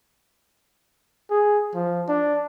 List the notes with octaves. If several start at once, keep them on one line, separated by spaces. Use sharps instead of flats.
G#4
F3
D4